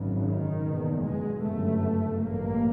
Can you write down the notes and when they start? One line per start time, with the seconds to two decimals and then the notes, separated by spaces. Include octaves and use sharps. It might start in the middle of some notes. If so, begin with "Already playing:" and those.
Already playing: G#1 F#2 C#3
0.24 D#3
0.64 F#1 E2 B2
1.03 G#3
1.43 G1 F#2 C#3 A3
2.23 A1 G2 A#3